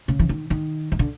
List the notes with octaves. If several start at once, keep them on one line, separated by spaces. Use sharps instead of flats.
C#3
E3
D#3
D#3
D#3
D3